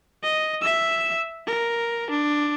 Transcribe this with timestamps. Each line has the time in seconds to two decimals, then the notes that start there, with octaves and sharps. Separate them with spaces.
0.23 D#5
0.62 E5 E6
1.47 A#4
2.10 D4